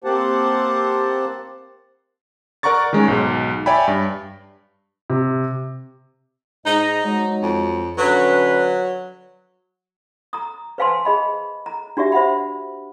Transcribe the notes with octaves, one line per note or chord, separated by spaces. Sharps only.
A#3 C4 G4 C5 F#5 A5
A#4 D5 F#5 A#5 C#6 A6
D#3 G#3 C#4
B1 G#2
C#5 D5 E5 G5 G#5 B5
G2
C3
G#2 D#4 D#5
F#3 G#3
F2
D3 F#3 C#4 B4
A#5 D#6
B4 C5 F5 G#5 A5 C6
G#4 D#5 B5
A#5
D4 F#4 G4 D5 E5
C5 E5 F#5 B5